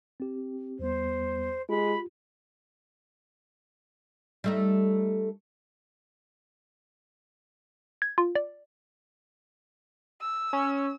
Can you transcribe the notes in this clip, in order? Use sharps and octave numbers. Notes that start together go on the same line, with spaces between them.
C4 G4
E2 G3 B3 C5
G#3 F4 G4 B5
G3 A3 D#4
G#6
F4
D5
E6
C#4